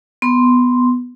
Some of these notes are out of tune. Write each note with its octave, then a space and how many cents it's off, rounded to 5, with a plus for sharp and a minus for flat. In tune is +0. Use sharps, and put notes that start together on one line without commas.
B3 +0 C6 +0